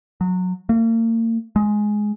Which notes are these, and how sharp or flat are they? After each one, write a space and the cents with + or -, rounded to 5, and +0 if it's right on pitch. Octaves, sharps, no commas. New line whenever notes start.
F#3 -20
A#3 -40
G#3 +10